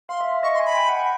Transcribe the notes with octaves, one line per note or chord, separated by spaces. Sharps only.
F5 C6
E5
E5
D#5 C#6
C6
G#5
B5
G#5
G5
F#5
G5